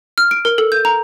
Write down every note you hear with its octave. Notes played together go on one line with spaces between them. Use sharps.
F6
D7
A#4
A4
G6
A#5